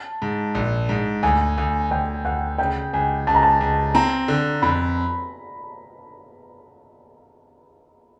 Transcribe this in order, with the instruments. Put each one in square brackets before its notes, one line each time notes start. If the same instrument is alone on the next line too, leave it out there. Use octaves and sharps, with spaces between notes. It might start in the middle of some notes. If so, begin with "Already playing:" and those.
Already playing: [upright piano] A5
[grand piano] G#2
A#1
G#2
[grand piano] D2 [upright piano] G#5
[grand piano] D2
[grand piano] D2 [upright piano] G5
[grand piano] D2 [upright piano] F#5
[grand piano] C#3 [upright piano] G5
[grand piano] C#2 [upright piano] G#5
[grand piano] C#2 [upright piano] A5
[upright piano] A#5
A5
[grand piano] C#2
[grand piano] C4 [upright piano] A#5
[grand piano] D3
[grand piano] F2 [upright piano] B5